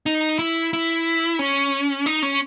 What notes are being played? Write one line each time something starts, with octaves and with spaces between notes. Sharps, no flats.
D#4
E4
E4
C#4
D#4
C#4